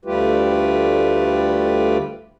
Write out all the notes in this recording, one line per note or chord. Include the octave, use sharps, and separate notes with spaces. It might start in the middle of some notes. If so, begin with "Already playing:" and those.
D2 G3 A3 F4 G4 B4